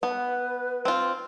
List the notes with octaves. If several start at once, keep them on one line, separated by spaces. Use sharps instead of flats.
B3 B4
C4 F4